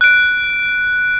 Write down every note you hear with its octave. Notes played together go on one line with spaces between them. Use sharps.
F#6 D7